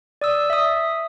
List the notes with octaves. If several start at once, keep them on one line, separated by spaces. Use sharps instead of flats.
D5 D#6 E6
E5 D#6